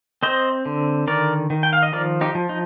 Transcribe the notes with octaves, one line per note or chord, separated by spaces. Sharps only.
C4 C5 D#5
D3
D#3 A#4 D5
D#3
G5
F5
D#5
F3 A#4 D5
D#4 G4
F3
D#4